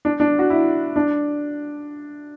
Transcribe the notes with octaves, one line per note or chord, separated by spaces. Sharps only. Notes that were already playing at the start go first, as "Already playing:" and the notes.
D4
D4
F#4
E4
D4